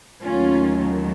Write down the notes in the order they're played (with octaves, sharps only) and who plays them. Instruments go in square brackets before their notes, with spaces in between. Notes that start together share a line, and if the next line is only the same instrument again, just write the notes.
[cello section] D#2 D#3 F#3 A3 C#4 F4